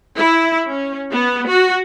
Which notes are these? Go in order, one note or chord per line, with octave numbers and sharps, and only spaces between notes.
E4
C#4
B3
F#4